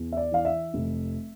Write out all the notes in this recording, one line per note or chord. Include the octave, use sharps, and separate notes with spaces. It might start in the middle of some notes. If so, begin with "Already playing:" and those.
Already playing: E2
E5
D5
E3 F5
E5
F1